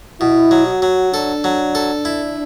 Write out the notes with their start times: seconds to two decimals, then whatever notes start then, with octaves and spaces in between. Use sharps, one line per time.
0.21 B2 E4
0.51 F#3
0.67 F#4
0.82 F#3
1.13 D4 A4
1.44 F#3
1.75 A4
2.05 E4